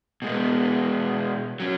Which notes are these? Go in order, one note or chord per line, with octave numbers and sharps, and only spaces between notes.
B2 G#3 B3
F#3 C#4